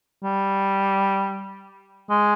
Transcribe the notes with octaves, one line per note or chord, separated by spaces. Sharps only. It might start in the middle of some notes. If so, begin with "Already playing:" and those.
G3
G#3